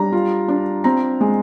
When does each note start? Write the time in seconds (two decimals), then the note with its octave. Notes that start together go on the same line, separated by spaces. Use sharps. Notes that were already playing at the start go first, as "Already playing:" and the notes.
Already playing: G3 D4 A#5
0.12 F4
0.48 D4
0.84 C4 A#5
1.21 G#3